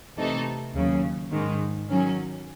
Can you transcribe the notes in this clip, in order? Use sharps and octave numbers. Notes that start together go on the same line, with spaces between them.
C3 E3 A3 D#4 A4
D#2 C#3 F#3
G#2 D#3 G#3
D#3 F#3 C#4